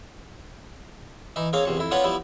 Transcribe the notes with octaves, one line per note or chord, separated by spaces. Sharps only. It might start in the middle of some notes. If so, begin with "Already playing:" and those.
E3 D#4
A#3 C4 G#4 C#5 F5
E2 C3 F3 C#6
F2 E4
B3 C#4 D4 F4 C#5 F#5
F3 G3 B3 E4